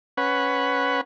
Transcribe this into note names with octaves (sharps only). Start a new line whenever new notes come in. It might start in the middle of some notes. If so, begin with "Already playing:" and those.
C#4 B4 F#5